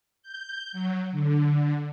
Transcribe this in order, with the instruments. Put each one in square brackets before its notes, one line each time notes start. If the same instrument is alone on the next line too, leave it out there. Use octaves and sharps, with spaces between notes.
[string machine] G6
F#3
D3